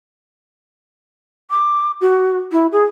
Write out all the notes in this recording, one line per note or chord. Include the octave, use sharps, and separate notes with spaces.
D6
F#4
E4
G#4